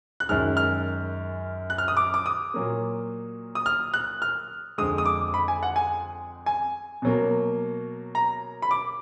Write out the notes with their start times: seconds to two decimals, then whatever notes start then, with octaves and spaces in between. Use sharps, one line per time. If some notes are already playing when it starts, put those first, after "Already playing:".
0.20 F#6
0.29 F#2 D#3 G#3 F6
0.57 F6
1.70 F#6
1.78 F6
1.88 D#6
1.97 D6
2.14 D6
2.26 D#6
2.54 A#2 F#3 A#3
3.55 D#6
3.66 F6
3.94 F#6
4.22 F6
4.78 F2 D3 G#3 D#6
4.98 D#6
5.06 D6
5.34 B5
5.48 G#5
5.63 F#5
5.76 G#5
6.46 G#5
7.02 B2 F#3 A#3
8.15 A#5
8.62 B5
8.71 D6